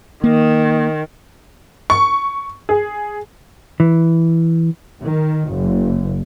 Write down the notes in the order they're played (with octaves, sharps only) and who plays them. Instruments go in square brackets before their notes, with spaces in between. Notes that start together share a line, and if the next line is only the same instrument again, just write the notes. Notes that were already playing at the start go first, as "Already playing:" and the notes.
[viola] D#3 [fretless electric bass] A#3
[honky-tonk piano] C#6
G#4
[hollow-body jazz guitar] E3
[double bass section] D#3
F#1